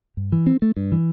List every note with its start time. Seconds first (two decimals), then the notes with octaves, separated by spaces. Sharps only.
0.17 G2
0.32 E3
0.47 C4
0.62 A3
0.77 G2
0.92 E3